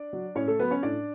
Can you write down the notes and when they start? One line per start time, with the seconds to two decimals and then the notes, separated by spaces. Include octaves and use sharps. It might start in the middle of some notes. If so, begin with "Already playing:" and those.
Already playing: D4 D5
0.13 F#3
0.35 A2 C#4 C#5
0.48 A3 A4
0.59 F#3 B3 B4
0.71 C#4 C#5
0.83 A2 D4 D5